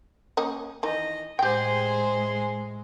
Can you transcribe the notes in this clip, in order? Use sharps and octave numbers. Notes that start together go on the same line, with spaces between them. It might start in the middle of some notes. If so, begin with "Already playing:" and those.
A#3 C#4 D#5
D#3 E3 D#5
A2 G#3 G4 G#4 C5 G5